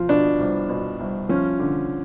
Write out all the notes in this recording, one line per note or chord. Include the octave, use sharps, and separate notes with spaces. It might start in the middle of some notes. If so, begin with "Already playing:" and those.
Already playing: F3
B2 D4
C2
B2
C2
F3 C#4
D3